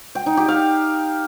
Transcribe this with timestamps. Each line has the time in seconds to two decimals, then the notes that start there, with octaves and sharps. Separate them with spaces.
0.15 G5
0.26 D#4
0.37 G4
0.48 F5